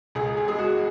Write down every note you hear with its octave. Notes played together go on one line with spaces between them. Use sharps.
C#2 G#4
G#4
G#3 G#4
F#4